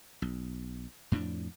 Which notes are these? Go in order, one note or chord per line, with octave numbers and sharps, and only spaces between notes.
B1
F2 A2 F3 D4